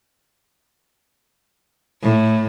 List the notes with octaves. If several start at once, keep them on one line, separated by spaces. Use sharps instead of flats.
A2